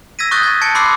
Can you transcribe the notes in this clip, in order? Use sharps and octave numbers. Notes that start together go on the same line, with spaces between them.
E6 G#6 A#6 B6 D#7
C#6 D#6 F#6 G6 A6 G7
G#6 B6
A5 G#6 C#7 D7
B5 C6 D6 E6 F#6 C7